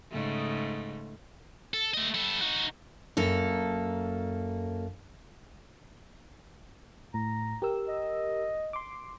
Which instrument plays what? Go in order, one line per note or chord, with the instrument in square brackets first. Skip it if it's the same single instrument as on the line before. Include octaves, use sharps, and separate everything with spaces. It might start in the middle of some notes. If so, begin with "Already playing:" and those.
[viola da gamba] G#2 C#3 A3
[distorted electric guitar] A4
A3 D#5
G3 A4
D#4 F#4
[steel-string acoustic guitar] F#2 A#3 A4
[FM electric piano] A2 [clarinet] A#5
[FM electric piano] G4 A#4 E6
[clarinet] D#5
[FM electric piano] C6 D6